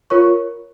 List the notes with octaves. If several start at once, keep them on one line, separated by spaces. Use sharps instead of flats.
F4 A#4 C#5 C#6